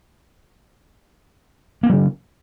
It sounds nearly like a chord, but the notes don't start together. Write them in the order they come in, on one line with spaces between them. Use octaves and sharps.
A#3 C4 F#3 C#3